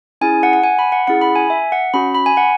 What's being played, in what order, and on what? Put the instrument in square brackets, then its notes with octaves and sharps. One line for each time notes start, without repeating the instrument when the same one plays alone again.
[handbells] C#4 E4 G#4 G#5
F#5
F#5
G#5
B5
F#5
C#4 E4 G#4 F#5
B5
G#5
E5
F#5
C#4 F#4 B5
B5
G#5
F#5